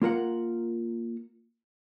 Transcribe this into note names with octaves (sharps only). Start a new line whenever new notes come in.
A#3 F4 A#4 F#5